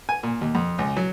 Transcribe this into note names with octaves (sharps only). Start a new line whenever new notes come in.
G#5
A#2
D#2
F2
C#2
F#3